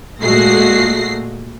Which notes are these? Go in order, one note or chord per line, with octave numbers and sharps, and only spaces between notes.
A#2 G#3 A3 F#4 A#6 C7